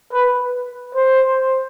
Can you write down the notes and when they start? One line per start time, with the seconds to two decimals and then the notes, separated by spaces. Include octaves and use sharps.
0.12 B4
0.95 C5